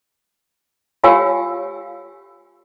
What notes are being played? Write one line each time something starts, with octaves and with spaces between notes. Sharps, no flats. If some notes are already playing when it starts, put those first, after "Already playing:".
F4 G4 C#5 F5 G#5 E6